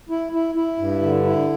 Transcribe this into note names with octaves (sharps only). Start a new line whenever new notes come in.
E4
E4
E4
G2
D3
E4